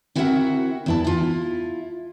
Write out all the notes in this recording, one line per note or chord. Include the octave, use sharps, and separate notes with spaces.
C4 E4 F#4 A#4 E5 F#5
E2 E4 A5
E4 F4